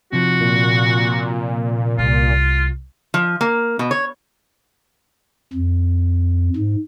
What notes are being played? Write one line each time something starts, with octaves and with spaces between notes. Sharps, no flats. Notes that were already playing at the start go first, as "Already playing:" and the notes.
C3 F3 F#4
A#2
C2 F4
F3
A#3
B2
C#5
F2
G#2